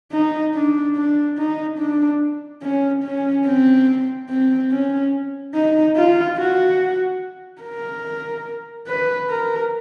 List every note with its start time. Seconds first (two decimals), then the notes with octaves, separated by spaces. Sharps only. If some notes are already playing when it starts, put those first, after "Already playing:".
0.12 D#4
0.54 D4
0.96 D4
1.37 D#4
1.78 D4
2.62 C#4
3.04 C#4
3.45 C4
4.29 C4
4.71 C#4
5.54 D#4
5.96 F4
6.38 F#4
7.62 A#4
8.88 B4
9.30 A#4